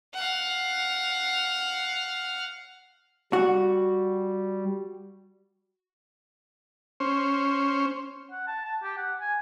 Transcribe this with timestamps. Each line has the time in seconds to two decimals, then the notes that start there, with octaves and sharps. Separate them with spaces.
0.14 F5 F#5
3.33 G3 F#4
7.00 C#4 C5
8.31 F#5
8.47 A5
8.65 A5
8.83 G4
8.98 F#5
9.21 G#5